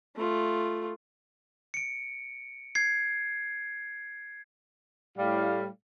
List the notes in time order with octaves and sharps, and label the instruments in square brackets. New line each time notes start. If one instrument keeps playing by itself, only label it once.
[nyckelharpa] A3 F4
[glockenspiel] C#7 D7
G#6 C7
[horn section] A2 G3 F5